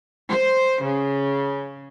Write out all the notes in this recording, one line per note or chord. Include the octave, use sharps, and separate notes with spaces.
C5
C#3